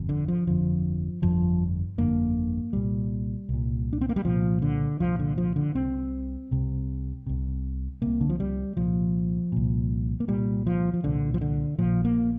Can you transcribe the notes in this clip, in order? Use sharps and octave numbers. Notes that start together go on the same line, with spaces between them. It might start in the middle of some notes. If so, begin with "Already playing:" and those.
Already playing: G1 F2
D3
F3
G1 F2 D3 F3
G1 F2 D3 F3
G1 F2 D3 A#3
C2 A#2 G3
C2 A#2
D4
C4
A#3
G3
C2 A#2 F3
D3
C2 A#2 F3
D3
F3
D3
C2 C3 C4
C2 C3
C2 C3
C2 C3 A#3
D3
F3
G3
C2 A#2 F3
C2 A#2
A#3
C2 A#2 G3
F3
F3
C2 A#2 D3
F3
D3
A#1 A#2 F3
A#3